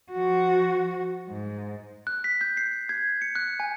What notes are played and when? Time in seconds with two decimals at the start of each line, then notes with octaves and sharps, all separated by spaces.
0.13 F3 F#4
1.29 G#2
2.07 F#6
2.24 B6
2.41 G6
2.57 C7
2.89 G#6
3.22 C#7
3.35 F#6
3.60 G#5